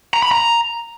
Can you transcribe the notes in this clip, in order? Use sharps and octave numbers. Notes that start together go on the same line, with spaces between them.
A#5
B5
A#5